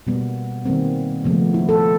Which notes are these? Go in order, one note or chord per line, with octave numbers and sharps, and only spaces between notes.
B2 G3 A#3 B3
D#3 G3 A#3 C4
C#3 F3 A3 B3
E4
A4